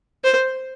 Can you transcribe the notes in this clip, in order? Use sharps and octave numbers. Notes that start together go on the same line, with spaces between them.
C5